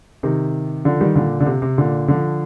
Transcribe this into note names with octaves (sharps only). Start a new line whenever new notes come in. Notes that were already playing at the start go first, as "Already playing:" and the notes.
C3 D#3
D3 F3
D#3 G3
A#2 D3
D3
C3
C3
A#2 D3
D3 F3